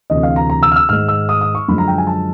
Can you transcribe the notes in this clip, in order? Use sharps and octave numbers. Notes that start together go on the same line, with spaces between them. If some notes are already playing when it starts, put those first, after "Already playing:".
D2 C3 E3 D#5
F5
A#5
A#5
E6
F6
E6
G#2 D#3 G#3 F6
E6
D#6
D#6
C#6
F#2 D3 F3 G#3 B5
A#5
G5
G#5
A5